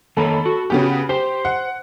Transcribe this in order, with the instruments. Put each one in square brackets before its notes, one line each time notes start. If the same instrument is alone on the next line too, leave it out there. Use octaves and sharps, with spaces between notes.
[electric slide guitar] D#3 A#3 C#5 [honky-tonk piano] A4 B5
[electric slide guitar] F#4
[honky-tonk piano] C#3 B3 G4
[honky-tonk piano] G4 [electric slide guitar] C5
[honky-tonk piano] F#5